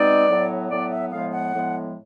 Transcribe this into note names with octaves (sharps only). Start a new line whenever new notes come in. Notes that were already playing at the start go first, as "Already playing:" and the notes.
Already playing: B2 G#3 C4 D#4 D5
A2 F#3 B3
A2 F#3 B3 D5
E5
A2 F3 G#3 B3 F5
F#5
A2 F3 G#3 B3